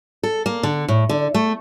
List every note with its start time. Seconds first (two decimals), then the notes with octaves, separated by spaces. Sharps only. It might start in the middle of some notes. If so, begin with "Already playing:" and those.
0.23 A4
0.46 A#3
0.63 D3
0.88 A2
1.09 D3
1.34 A3